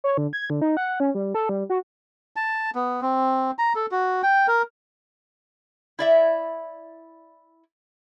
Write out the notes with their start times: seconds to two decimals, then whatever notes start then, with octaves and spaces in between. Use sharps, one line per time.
0.04 C#5
0.18 D3
0.33 G#6
0.50 D3
0.61 D#4
0.77 F#5
1.00 C#4
1.15 G3
1.34 A4
1.49 G3
1.70 F#4
2.36 A5
2.75 B3
3.02 C4
3.59 A#5
3.75 A4
3.91 F#4
4.23 G5
4.48 A#4
5.99 E4 D5 E5